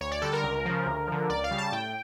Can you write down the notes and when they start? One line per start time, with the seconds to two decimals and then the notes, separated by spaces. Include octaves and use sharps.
0.01 D2 C#5
0.12 D5
0.22 D3 G3 A4
0.33 A#4
0.44 C#2
0.65 C#3 F3
0.86 D2
1.07 D3 F3
1.29 C#2 D5
1.44 F5
1.51 C#3 G3
1.58 A5
1.72 A2 G5